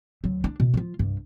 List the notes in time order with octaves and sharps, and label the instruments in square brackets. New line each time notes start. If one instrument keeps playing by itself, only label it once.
[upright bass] D2 F#3
D4
B2
F3 F4
C2 G2